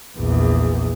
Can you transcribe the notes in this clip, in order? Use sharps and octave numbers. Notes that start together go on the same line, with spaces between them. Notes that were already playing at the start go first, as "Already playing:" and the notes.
A#1 E2